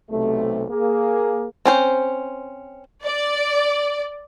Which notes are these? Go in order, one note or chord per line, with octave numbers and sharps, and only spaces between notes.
B1 C3 A3
A#3 G#4
C4 C#4 C5
D5